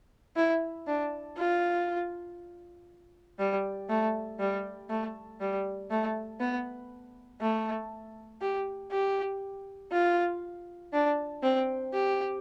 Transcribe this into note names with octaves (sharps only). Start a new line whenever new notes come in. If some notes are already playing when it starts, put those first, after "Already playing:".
E4
D4
F4
G3
A3
G3
A3
G3
A3
B3
A3
G4
G4
F4
D4
C4
G4